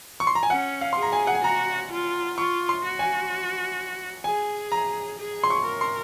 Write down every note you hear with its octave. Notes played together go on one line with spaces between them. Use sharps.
C#6
C6
A#5
G#5
C#4 F#5
F5
G#4 C6
A#5
G#5
F#5
G#5
F#4 A#5
F4
F4 C#6
C6
F#4
G#5
G#4 G#5
A#5
G#4
C6
C#6
A#4
C6